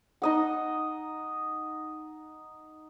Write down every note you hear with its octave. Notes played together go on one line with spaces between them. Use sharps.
D#4 D#5 F#5